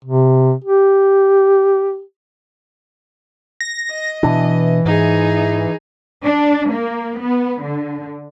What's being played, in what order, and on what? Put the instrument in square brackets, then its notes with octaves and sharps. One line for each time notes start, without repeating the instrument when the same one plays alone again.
[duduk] C3
G4
[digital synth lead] A#6
[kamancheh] D#5
[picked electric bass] B2 D4 [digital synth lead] E3
[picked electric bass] G#2 [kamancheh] D#4 G#4
[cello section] D4
A#3
B3
D3